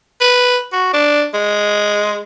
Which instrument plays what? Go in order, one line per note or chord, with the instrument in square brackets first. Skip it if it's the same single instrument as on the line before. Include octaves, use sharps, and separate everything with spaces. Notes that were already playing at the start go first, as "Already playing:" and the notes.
[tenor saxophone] B4
F#4
D4
G#3